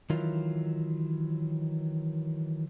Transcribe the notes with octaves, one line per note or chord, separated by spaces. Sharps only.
D#3 E3 F#3 F4